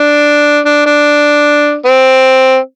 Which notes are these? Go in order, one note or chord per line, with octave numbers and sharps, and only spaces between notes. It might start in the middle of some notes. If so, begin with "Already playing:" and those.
Already playing: D4
D4
D4
C4